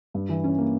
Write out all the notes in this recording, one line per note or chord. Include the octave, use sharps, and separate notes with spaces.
G2
E3
C#4
A#3